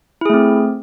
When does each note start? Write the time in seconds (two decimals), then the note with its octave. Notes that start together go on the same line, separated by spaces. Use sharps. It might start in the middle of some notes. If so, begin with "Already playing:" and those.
0.21 E4
0.26 G#4
0.30 A3
0.34 C4